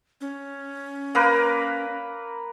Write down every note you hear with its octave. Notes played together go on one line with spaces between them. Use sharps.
C#4
A#3 A#4 B4